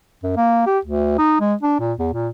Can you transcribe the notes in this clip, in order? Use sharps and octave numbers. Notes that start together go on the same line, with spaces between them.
F#2
A#3
G4
D2
D#4
G#3
D4
A#2
E2
A#2